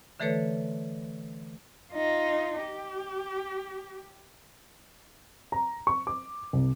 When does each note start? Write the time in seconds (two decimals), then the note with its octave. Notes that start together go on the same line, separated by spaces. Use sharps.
0.20 D3 E3 A3 A4 B4 C#5
1.93 D#4 F4
2.62 G4
5.52 A#5
5.87 C#6
6.07 D6
6.53 C2